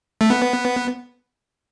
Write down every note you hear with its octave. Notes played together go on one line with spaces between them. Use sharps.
A3
B3